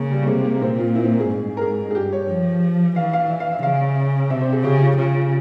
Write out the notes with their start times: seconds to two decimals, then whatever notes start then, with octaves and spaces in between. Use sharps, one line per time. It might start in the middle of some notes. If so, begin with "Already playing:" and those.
Already playing: C#3 A#3
0.11 G3
0.23 A#3
0.27 C3 G#3
0.44 A#3
0.55 A#3
0.61 A#2 C4
0.78 F4
0.95 E4
1.03 C4
1.12 A#3
1.20 G#4
1.29 G#2
1.57 A#4
1.61 G#4
1.91 G#4
1.95 G2 G4
2.12 C#5
2.29 F3
2.96 E3 F5
3.13 F5
3.30 E5
3.40 F5
3.52 E5
3.63 C#3 F5
4.30 C3 E5
4.42 C5
4.53 G#4
4.63 C#3 G4
4.81 F4
4.97 C#3 F4
5.14 F4